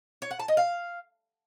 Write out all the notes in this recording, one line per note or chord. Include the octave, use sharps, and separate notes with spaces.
C#5
F#5
A5
D#5
F5